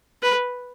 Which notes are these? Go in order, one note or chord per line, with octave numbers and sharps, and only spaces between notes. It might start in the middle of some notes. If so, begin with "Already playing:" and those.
B4